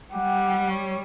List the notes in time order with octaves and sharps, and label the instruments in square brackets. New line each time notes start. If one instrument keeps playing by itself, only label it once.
[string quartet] G3 [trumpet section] G4 F#5
[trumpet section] C#5